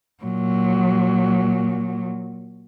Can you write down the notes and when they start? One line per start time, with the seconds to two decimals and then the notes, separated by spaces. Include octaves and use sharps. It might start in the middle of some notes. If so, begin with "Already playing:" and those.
0.24 A#2 F#3